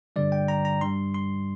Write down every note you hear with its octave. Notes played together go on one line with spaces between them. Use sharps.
G2 D3 G3 D5
G5
A#5
A#5
G2 G3 C6
C6